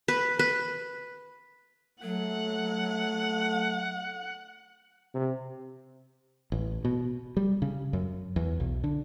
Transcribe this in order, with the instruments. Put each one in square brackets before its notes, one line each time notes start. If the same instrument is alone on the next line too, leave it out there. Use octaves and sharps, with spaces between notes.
[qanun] B4
B4
[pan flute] F#3 [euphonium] A3 [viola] F#5
[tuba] C3
[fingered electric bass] A1
B2
G3
C#3
F#2
E2
B1
D3